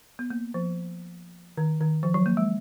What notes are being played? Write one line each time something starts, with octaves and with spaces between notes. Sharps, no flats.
B3
A#3
F3
D#3
D#3
F3
F#3
A#3
G#3